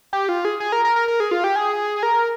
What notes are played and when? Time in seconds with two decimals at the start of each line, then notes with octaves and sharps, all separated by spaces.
0.13 G4
0.29 F4
0.45 G#4
0.60 G#4
0.72 A#4
0.85 A#4
0.96 A#4
1.08 A#4
1.20 G#4
1.31 F4
1.44 G4
1.56 G#4
2.03 A#4